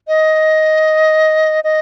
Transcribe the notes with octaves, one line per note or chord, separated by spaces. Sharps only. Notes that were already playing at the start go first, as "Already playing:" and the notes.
D#5
D#5